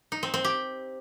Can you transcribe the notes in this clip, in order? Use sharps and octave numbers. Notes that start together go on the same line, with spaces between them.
D#4
C4
C4
G4